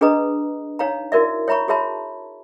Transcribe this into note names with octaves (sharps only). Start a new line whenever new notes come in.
D4 G#4 B4 D#5 A#5 D#6
D#4 C#5 F5 A#5
E4 F#4 A#4 D5 E5
C#5 E5 A#5 B5 C#6
F#4 G#4 C#5 E5 A5 B5